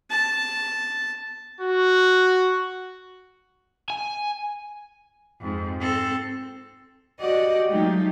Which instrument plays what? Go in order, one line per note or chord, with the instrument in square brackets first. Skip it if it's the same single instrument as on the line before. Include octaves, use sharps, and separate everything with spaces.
[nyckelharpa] A5
[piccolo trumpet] F#4
[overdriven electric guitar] G#5
[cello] F2 G#2
C4 A4
[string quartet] F#4 G4 D5 D#5 F#5
F#3 G#3 A3 D#4 F4 G4